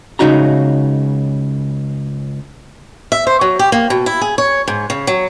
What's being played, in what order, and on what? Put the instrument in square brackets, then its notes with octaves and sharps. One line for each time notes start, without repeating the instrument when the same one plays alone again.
[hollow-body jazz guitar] C#2 F#2 C#3 D#4 F#4 A#5
[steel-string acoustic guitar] E5
C5
F#3
G4
A#3
B2
E4
G#4
C#5
G#2
C#3
F#3